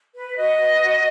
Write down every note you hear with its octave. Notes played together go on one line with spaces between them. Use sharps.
B4
F#4 D#5
B4
F#4